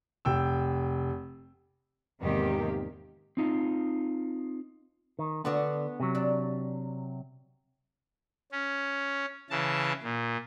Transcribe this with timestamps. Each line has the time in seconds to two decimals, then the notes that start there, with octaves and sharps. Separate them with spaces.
0.25 F1 G5 E6
2.21 E2 G#2 C3 D#3 A#3 G4
3.37 C4 D#4 F4
5.19 D#3
5.45 D3 B3 D4 F#4
6.00 C3 F#3
6.15 D4
8.52 C#4
9.50 C#3 E3 A5
10.03 A#2